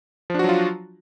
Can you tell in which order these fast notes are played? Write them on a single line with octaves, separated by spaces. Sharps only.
F3 D4 F#4 F#3 F4